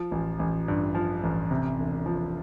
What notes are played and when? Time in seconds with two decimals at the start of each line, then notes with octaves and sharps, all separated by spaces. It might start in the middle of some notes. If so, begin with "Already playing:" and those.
Already playing: F3
0.11 A1
0.39 A1
0.68 G2
0.95 F3
1.23 A1
1.51 C3
1.79 E1
2.06 F3